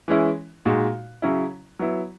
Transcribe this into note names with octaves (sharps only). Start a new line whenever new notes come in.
E3 G#3 C#4 E4
A#2 G#3 D#4 F#4
C#3 F#3 C#4 E4
F#3 B3 E4